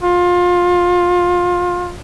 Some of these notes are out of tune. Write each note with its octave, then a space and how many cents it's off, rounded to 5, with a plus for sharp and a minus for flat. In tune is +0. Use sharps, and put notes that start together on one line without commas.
F4 +25